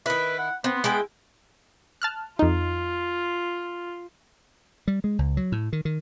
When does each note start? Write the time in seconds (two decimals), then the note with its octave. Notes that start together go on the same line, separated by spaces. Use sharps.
0.06 D#3 E4 B4
0.38 F#5
0.64 B3 C4
0.84 G#3 E4 G5
2.02 A5 F6 F#6
2.39 F2 D#4 F4
4.88 G3
5.04 G#3
5.19 C#2
5.37 F#3
5.52 A2
5.73 D#3
5.85 D#3